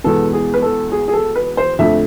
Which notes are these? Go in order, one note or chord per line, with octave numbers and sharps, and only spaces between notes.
E2 B2 G#3 B3 A4
G#4
B4
A4
G#4
G#4
A4
B4
C5
F2 D3 A3 E5